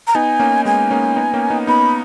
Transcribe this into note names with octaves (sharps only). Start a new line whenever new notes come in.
A#5
B3 D#4 G#5
A#3 C#4
G#3 B3 G#5
A#3 C#4
B3 D#4
A#3 C#4
B3 D#4
B3 D#4 B5